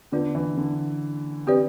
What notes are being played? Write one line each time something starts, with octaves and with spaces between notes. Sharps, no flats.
D3 B3 F4 B4 D5
E3
D3
C4 G4 B4 D5